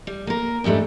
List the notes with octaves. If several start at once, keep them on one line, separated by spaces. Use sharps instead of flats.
G3
A#3 A#4
E2 G#2 G3 A3 D4